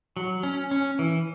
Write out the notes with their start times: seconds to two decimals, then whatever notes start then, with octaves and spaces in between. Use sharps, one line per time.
0.17 F#3
0.43 C#4
0.71 C#4
0.99 E3